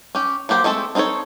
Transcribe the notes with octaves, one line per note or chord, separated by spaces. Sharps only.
C#4 G4
F#3 A#3 G4 C5 F#5
G#3 A3 C4 A4
C4 D#4 F4 A4 C#5